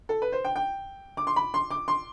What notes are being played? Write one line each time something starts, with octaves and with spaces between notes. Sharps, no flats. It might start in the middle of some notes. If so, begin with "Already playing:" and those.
A4
B4
C5
G5
G5
D6
C6
B5
C6
D6
C6